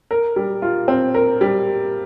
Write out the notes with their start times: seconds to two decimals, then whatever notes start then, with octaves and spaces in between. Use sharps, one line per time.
0.11 A#4
0.36 G3
0.62 F4
0.88 C4
1.14 A#4
1.41 G3